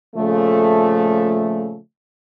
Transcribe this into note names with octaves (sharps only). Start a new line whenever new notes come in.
A#2 C#3 F3 A3